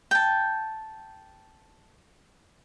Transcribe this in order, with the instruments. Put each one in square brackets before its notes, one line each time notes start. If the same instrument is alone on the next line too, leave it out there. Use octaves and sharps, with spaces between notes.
[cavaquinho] G5 A5